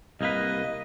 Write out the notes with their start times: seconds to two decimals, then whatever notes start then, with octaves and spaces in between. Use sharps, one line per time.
0.21 C2 A#3 B4 D#5